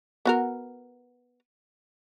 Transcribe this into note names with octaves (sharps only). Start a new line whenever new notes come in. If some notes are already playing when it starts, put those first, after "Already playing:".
B3 F#4 A#4